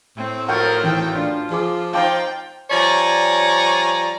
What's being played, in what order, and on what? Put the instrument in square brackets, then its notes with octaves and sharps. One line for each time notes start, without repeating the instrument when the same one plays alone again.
[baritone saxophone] A2 [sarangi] C4
[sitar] F3 F#3 B3 [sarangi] A#4 [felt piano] F#5 C#6 G6
[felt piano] G#1 E3 [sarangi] G5
[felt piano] D4 [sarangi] F4
[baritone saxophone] F3 [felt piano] G#4 D6
[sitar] C4 D#4 F4 [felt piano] F5 A5 D6 [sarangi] G5
[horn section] F3 G3 C#5 D5 G#5 A#5